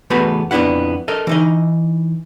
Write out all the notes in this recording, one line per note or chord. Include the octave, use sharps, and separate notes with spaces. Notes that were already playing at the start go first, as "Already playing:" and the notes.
E2 A3 B3 F#4 B4 A5
F2 B3 D4 E4 F#5
A4 A#4 D#5
E3 D#4 D#5